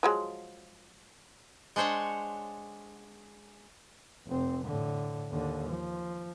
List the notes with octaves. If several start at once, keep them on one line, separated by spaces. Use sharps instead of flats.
F3 F#3 G#3
G#3 D4 C5 C#5 F#5
F1 C4
A2 D3
D#2 D3
F3